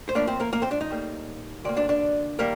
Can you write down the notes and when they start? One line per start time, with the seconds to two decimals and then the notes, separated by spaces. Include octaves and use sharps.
0.09 C5
0.15 A2 F3 A#3 D4 D5
0.27 C4 C5
0.40 A#3 A#4
0.53 A#3 A#4
0.62 C4 C5
0.71 D4 D5
0.81 D#4 D#5
0.90 A2 G3 A#3
1.64 D2 C3 A#3 D5
1.77 D4 D5
1.89 D4 D5
2.39 D#3 G3 A#3 A#4